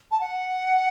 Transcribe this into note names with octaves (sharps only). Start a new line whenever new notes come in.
A5
F#5